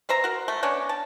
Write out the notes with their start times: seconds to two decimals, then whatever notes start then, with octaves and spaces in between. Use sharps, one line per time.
0.09 B4 C5 E5 A#5
0.24 F#4 A#4
0.48 A3
0.63 B3 C#4 D4 C#5
0.89 A5